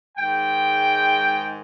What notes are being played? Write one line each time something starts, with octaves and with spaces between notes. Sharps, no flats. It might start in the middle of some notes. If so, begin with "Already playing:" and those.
G#2 D#3 G#3 G5